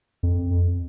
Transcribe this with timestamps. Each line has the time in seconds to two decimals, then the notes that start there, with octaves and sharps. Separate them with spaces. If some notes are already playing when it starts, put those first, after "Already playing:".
0.23 F2